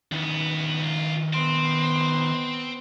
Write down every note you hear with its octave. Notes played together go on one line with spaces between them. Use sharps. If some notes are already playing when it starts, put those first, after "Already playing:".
E2 D#3 B3 E4
C#2 F4
B3 C4 C6